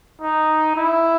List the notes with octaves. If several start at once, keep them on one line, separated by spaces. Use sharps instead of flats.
D#4
E4